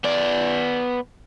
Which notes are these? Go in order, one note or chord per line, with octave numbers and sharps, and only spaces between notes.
B3 D5